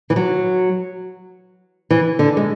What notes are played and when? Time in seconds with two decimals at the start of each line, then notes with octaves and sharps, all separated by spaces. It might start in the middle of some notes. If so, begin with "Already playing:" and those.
0.10 E3
0.16 F#3
1.91 E3
2.19 D3
2.37 G#3